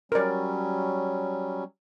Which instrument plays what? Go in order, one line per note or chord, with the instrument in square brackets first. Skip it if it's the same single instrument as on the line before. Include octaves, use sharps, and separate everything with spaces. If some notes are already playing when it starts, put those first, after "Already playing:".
[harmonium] F#3 G3 C#4 [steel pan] A#4 D5